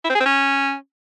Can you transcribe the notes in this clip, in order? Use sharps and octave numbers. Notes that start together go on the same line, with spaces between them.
E4
C4
G#4
C4
C#4